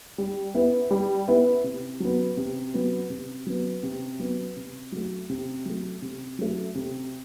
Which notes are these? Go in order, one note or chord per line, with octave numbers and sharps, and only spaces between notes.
G3
B3 E4 B4
G3
B3 E4 B4
C3
F#3 B3
C3
F#3 B3
C3
F#3 B3
C3
F#3 B3
C3
F#3 A3
C3
F#3 A3
C3
F#3 A3
C3